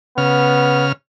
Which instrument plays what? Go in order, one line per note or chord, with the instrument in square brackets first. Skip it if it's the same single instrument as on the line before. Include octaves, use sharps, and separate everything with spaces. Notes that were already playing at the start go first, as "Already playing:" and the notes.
[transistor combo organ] C#3 F6 [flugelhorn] B3